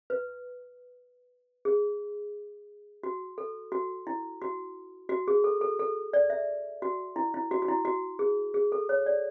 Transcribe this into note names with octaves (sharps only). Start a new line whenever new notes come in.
B4
G#4
F#4
A4
F#4
E4
F#4
F#4
G#4
A4
A4
A4
D5
E5
F#4
E4
E4
F#4
F#4
E4
F#4
G#4
G#4
A4
C#5
D5